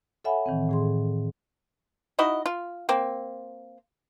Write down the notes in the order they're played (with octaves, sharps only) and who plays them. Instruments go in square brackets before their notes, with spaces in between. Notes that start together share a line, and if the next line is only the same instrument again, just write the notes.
[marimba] A4 C#5 E5 F#5 G#5 B5
A2 D#3 E3 C4
A2 G#4 C6
[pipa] D#4 E4 F#4 D#5
F4
A#3 C4